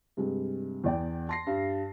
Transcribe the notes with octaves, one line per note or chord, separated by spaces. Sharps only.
G2 C3 G#3
E2 D5 G5
A5 C6 A#6 C7
G2